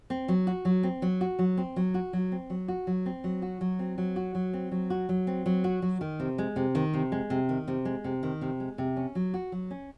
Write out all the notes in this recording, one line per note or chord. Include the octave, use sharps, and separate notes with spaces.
C4
F#3
F#4
F#3
C4
F#3
F#4
F#3
C4
F#3
F#4
F#3
C4
F#3
F#4
F#3
C4
F#3
F#4
F#3
C4
F#3
F#4
F#3
C4
F#3
F#4
F#3
C4
F#3
F#4
F#3
D#3
C3
G#3
C3
D#3
C3
G#3
C3
D#3
C3
G#3
C3
D#3
C3
G#3
C3
C#4
F#3
F#4
F#3
C#4